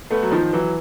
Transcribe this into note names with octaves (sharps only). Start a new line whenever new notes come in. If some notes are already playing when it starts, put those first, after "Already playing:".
A3 B3
F#3
D#3 F3
E3 F#3